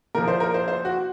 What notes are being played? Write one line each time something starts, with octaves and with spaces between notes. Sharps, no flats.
A#2 F3 A#4
C5
A#4
C5
C5
F#4